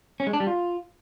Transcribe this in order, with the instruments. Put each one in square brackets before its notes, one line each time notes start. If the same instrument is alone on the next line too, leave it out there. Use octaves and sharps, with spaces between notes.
[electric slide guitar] C#4
G#3
D4
G3
F4